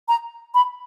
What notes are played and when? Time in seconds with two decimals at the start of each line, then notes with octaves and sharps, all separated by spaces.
0.08 A#5
0.54 B5